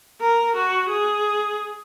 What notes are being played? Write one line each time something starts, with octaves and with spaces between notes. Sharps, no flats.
A#4
F#4
G#4